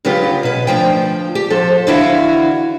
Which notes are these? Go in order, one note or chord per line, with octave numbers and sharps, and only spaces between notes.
C#3 F#3 B3 F4 G4
B2 B4
D2 C#3 F3 G5
G4
F3 A4 C5
D3 E3 E4 F#4 E5 F5